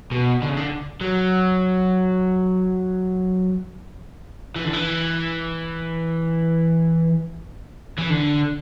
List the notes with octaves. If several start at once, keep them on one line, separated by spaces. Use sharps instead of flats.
B2
D3
C#3
D3
F#3
E3
D3
E3
E3
D3